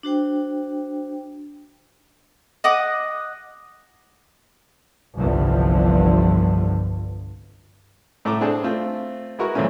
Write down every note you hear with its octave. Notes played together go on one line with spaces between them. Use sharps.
D4 F#4 C5 G5
D#5 F#5 D6 D#6
G1 C2 G2 D3 E3 F3
A2 A3 A#5 D6
C4 D4 G#4 A4
A3 C4 F4
G#3 E4 F#4 A#4 B4 C#6
F#2 A#2 E3 A3 C4 C#4